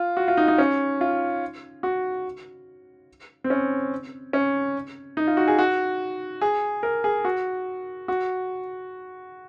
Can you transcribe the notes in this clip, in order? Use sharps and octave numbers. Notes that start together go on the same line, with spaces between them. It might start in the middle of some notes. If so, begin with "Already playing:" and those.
Already playing: F4
F#4
F4
D#4
D#4
C#4
F4
F#4
C4
C#4
C#4
D#4
F4
F#4
G#4
F#4
G#4
A#4
G#4
F#4
F#4